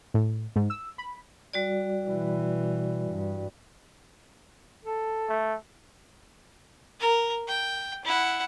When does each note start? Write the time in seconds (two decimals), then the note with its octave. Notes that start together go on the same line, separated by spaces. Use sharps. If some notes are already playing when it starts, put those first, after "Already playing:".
0.14 A2
0.56 G#2
0.70 E6
0.98 B5
1.53 G3 F#4 D5
2.06 B2 E3
3.10 G2
4.85 A4
5.29 A3
7.00 A#4
7.48 G5
8.05 E4 F#5